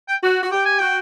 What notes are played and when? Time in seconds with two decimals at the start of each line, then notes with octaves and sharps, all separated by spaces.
0.08 G5
0.22 F#4
0.42 F#4
0.51 G4 G5
0.65 G#5
0.79 F#4 G5